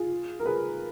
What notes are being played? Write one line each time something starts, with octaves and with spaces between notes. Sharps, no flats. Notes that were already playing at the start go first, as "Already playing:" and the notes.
Already playing: F4 G#4
A#4
G#4 B4